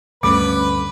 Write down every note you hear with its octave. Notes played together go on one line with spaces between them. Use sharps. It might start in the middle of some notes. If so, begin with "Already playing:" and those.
D2 G2 D3 A3 C#4 B4 D6